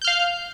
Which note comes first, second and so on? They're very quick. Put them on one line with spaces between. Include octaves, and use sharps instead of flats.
G6 F6 F5